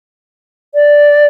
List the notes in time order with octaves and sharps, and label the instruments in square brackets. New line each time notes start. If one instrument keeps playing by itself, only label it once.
[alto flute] D5